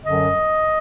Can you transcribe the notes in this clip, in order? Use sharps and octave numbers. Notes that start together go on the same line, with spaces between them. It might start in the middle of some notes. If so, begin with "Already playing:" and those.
F#2 D3 F#3 D#5